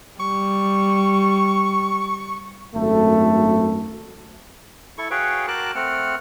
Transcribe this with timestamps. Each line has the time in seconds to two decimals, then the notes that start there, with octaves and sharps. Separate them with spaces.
0.20 G3 C#6
2.74 G#1 F#2 A3 A4
4.98 E4 A4 C#6
5.11 F#4 G#4 B4 C#5 F5 G5
5.48 F#4 A#4 G5 A5 D6 F#6
5.75 A3 C4 F#5 F6